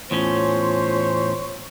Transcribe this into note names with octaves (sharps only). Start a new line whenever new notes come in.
E2 A2 C#4 F4 C5 C#5